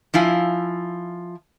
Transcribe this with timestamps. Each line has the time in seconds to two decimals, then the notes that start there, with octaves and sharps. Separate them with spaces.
0.14 F3 E4 F4 G#5